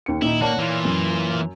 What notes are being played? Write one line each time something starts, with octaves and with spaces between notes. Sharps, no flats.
D#2 C#7
A#2 D#3 D#4 E4
A#3 F#4 C#5 D5 A5
E3 A#3 F4
F#2